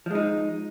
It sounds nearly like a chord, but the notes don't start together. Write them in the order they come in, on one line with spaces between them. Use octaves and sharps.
F3 G#3 D#4